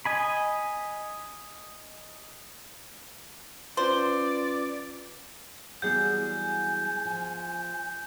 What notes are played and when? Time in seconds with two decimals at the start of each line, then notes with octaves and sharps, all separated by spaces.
0.05 D#5 G#5 B5
3.77 C#4 F4 B4 C5 D5
5.82 E3 F#3 G3 B3 G#4 F#5 G#5 G6
7.05 F3